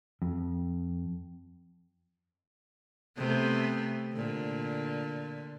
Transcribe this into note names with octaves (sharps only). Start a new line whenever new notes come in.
F2
C3 A3 B3
A#2 D3